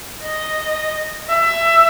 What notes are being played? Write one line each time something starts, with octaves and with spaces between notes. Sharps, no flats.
D#5
E5